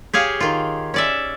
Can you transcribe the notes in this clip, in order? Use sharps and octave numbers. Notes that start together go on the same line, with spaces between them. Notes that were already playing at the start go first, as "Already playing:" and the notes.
G4 G#4 C#5 F5
D#3 F4
C#4 D5 E5